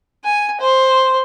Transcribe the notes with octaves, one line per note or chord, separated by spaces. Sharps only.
G#5
C5